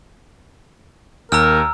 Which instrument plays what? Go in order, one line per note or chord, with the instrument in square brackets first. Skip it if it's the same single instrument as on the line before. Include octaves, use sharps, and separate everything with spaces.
[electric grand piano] D#2 [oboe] A#4 [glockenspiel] A#5 E6 F6